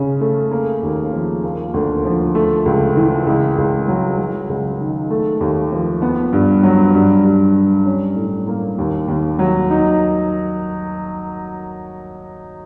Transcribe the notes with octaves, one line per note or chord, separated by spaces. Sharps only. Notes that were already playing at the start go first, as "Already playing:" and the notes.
Already playing: C#3 C#4
A3
A#3
D#2
F3
A#3
D2
F3
A3
C#2
E3
C#2
C#2
F#3
F#3
C#2
D#3
A3
D#2
F3
B3
G2
F#3
G2
G2
G3
C#4
A2
A#3
D#2
D#2
F#3
D#4